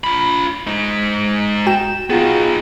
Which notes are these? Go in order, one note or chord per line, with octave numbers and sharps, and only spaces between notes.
F4 B5
G#3 D#4
F#4 G5 E7
B3 D#4 F4 F#4 G#4